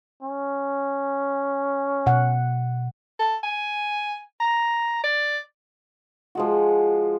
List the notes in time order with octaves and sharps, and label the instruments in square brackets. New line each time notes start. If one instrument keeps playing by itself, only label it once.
[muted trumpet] C#4
[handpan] B2 F#5
[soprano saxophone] A4
G#5
A#5
D5
[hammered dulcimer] F3 G#3 F#4